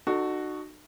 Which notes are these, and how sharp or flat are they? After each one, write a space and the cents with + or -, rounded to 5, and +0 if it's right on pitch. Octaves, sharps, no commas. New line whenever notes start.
D#4 -40 F#4 +0 A4 +0